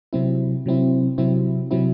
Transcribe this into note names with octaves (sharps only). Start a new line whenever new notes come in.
C3 F#3 C4 E4
C3 F#3 C4 E4
C3 F#3 C4 E4
C3 F#3 C4 E4